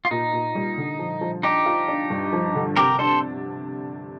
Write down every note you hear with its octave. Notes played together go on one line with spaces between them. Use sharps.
F4
A#2 D#4
A#2
G3
D3
F3
F3
D4 D#4 G4
F4
D4
G2
F3
D3
C3 G4 A#4
D4 A4 C5